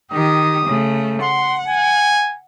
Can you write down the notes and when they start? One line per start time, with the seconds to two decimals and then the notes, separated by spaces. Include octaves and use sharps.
0.12 D#3 G4 D#6
0.65 C#3 A3
1.22 F#5 C6
1.68 G#5